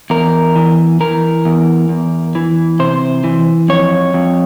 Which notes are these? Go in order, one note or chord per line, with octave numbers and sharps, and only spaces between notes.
E2 A#4
E3
E3 A#4
E2
E2
E3
C3 C5
E3
F2 C#5
F2